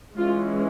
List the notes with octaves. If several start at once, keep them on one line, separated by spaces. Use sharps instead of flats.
E3 G#3 C#4 F4